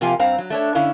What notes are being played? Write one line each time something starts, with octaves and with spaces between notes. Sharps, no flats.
C3 F3 A#3 F4 G4 G#5
G2 C4 F5 A#5
F#3
A3 D4 C#5
D3 C#4 E4 F5